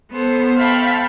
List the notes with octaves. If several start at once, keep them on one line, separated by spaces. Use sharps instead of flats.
B3 A4 C5
E5 F5 G5 A5 B5 C#6